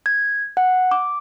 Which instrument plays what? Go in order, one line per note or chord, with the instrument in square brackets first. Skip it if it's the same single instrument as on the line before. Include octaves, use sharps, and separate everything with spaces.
[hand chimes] G#6
F#5
D6